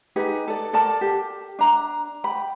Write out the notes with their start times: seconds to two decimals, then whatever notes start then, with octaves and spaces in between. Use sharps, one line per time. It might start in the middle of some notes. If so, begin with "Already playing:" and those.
0.16 D#4 G4 G#4 B4
0.48 A4 D5
0.73 A4 A#4 D5 A5
1.01 G4
1.59 D4 A#5
2.24 G5 B5